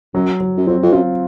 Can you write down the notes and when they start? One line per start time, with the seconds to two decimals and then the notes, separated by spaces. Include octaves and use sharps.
0.14 F#2 F#3
0.40 F#3
0.57 F#2
0.67 F2 C4
0.83 F2
0.93 F#2 F4